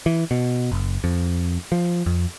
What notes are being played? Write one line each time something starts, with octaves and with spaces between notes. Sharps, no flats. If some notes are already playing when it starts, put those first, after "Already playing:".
E3
B2
F#1
F2
F3
F2